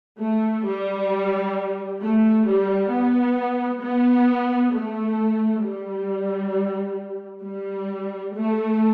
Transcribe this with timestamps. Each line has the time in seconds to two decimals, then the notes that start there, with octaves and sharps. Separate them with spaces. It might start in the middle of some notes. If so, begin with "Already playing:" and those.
0.19 A3
0.64 G3
2.00 A3
2.45 G3
2.89 B3
3.81 B3
4.72 A3
5.62 G3
7.42 G3
8.33 A3